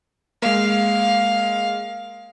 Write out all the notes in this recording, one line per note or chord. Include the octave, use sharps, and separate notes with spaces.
G#3 A#3 F5